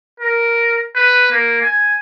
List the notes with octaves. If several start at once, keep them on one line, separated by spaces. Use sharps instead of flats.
A#4
B4
A#3
G#5